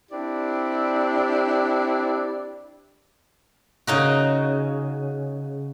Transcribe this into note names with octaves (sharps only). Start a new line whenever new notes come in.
C4 D4 E4 G4 D5
C#3 D#4 F#4